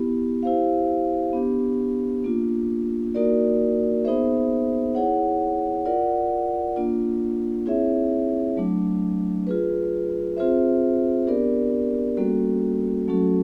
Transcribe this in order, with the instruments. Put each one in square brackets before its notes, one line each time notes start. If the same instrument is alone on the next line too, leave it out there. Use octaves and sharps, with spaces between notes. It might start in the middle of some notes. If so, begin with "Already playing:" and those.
Already playing: [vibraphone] B3 E4 G4
E4 G4 C5 F5
B3 D4 G4
A#3 D4 F4
A#3 D#4 F#4 A#4 D5
B3 D#4 G#4 C5 E5
E4 G#4 C#5 F#5
F4 A#4 D5 F#5
A#3 D4 F4
C4 E4 G#4 C#5 E5
F#3 A3 D4
F4 G#4 B4
C4 F4 G#4 C5 E5
B3 D4 G4 A#4 D5
G3 A#3 C#4 F#4 A4
F#3 A3 C#4 F#4 A4